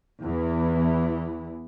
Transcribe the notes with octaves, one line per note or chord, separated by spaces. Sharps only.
E2 E3